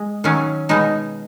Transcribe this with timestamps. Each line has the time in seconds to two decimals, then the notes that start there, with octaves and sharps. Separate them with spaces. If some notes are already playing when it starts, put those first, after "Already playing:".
Already playing: G#3
0.24 D#3 F#3 C#4
0.69 B2 G#3 D#4